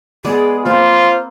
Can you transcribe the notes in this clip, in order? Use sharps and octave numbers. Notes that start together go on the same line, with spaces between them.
G#3 B3 G#4 D5
A#3 C4 F4 C5